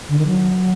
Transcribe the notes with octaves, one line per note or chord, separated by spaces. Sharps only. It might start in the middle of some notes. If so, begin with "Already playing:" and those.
D3
D#3
F#3